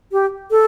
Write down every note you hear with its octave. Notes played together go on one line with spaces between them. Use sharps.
G4
A4